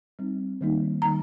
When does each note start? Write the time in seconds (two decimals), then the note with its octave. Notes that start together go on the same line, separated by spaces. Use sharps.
0.19 G3 C4 D#4
0.61 D#3 G3 A#3 D#4
1.02 D#3 G3 A#3 D#4 A#5